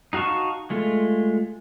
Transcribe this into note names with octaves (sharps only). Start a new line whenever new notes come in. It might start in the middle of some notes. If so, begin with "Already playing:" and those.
D#4 F#4 F5 A5 C#6
G#3 A3 F4